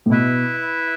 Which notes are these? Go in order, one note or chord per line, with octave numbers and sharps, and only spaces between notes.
A2
B2 E4 B4 E5